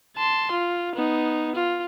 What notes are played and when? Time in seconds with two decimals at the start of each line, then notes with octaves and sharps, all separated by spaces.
0.17 A5 C6
0.52 F4
0.95 B3 D#4
1.55 F4